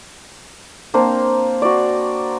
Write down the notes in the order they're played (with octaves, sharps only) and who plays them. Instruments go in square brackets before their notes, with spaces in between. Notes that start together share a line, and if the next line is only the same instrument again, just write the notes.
[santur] A#3 C4 D4 C5
F#4 D5